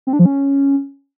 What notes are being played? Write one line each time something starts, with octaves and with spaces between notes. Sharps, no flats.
C4
D4
F3
C#4